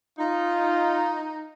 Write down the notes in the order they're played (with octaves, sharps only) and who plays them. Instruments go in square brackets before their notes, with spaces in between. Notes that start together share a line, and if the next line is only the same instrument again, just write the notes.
[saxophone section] D#4 [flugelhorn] F4